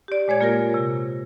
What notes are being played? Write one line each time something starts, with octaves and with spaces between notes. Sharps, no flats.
G4 D5
A#2 G#3 C#5 G#6
A#3 F4 G4 A#4 A#6
C3